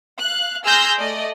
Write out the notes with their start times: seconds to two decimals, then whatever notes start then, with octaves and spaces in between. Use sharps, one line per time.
0.19 F5 F#6
0.63 G#4 C6 E6 F6 G6 A#6
0.98 A3 D5 D#5